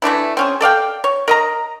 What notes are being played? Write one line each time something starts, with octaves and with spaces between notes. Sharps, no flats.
E3 A3 D4 E4
C4 C#4 G#4
A4 D5 F5 G5
C#5
A#4 D#5 A#5